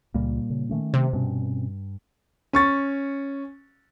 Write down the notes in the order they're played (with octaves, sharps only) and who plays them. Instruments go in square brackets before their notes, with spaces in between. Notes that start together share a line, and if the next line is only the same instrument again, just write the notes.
[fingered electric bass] C#2 [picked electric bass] A#2 G3 A#3
[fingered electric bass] C#3
D#3 A3 C#4
[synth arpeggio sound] C3
[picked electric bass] G2 [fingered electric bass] B2 C4 C#4
[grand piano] C#4 C#6 A6